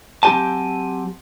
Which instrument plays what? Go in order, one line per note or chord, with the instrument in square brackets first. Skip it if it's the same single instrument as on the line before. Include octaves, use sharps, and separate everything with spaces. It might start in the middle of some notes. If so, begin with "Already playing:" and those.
[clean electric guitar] F#3 C4 F4 G4 G#5 A5